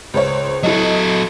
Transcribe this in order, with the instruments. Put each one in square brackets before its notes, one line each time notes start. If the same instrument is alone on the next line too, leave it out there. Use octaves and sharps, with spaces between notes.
[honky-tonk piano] C#2 C5 C#5
[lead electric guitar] F#3 A4 [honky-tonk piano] E4 D#5